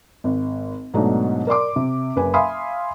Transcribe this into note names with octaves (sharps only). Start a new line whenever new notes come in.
G#1
G#2 B2 F#3 A3 D4 D#4
A#4 D5 C6 D6
C3
F#1 B4 G#5
E5 F5 G#5 B5 C6 D#6